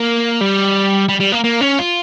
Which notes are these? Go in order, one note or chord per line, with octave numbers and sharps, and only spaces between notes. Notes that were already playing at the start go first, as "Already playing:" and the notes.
Already playing: A#3
G3
G3
G3
A#3
A#3
C#4
F4